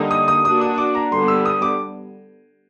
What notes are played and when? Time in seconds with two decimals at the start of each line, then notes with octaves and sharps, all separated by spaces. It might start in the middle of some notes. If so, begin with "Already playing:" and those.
Already playing: D3 G3 A#3 D#4
0.11 D#6
0.28 D#6
0.45 A#3 D4 F#4 D#6
0.61 D#6
0.78 D6
0.95 A#5
1.12 D3 G3 B3 C6
1.28 E6
1.45 D#6
1.62 D6